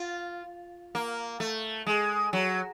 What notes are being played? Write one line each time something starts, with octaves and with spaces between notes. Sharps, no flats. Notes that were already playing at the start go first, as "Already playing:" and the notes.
Already playing: F4
A#3
A3
G#3
F#3